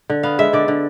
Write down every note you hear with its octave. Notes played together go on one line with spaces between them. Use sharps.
D3
B3 F5
G#3 E5
D3 D5
D3